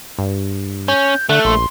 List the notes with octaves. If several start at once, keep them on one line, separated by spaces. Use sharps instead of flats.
G2
C#4 G6
D3 A3 F#6
A#1 C6